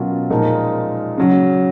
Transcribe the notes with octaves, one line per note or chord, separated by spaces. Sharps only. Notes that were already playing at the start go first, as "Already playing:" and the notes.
Already playing: B2 F#3 C#4 F4 A#4
A#2 F3 G#3 D#4 A#4
C#3 F#3